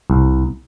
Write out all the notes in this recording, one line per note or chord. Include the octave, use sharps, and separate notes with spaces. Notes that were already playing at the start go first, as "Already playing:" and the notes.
C2